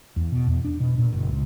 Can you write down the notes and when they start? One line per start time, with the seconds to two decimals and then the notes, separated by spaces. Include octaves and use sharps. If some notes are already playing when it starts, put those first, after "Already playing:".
0.16 E2
0.32 B2
0.47 E2
0.65 D4
0.80 B2
0.98 A#2
1.12 F#1
1.29 C#2